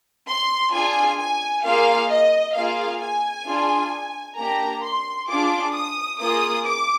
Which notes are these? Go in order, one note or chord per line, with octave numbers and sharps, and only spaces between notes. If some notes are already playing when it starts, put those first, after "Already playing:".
C6
D4 F4 G#4 G#5
G#5
A#3 F4 G#4 F5
D#5
A#3 F4 G#4 F5
G#5
D4 F4 G#4
A#3 D4 G4 A#5
C6
D4 F4 G#4 D6
D#6
A#3 F4 G#4 D#6
D6